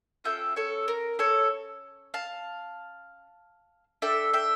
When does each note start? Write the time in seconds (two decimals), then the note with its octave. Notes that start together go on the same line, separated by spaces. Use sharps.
0.24 C#4 F4 A4 E5 G5
0.56 A4 C#5
0.88 A#4
1.19 A4 C#5
2.14 F5 A5
4.02 D4 A4 E5 G5
4.33 E5 G5